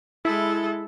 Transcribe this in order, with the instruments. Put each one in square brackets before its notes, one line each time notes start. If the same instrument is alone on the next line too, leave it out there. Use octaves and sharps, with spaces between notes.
[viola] G#3 A4 [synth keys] E4